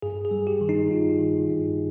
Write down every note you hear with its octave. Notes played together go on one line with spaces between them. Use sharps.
G2 G#4
G#4
G3
G4
D#3
D#4
G2 F4
D#3
G2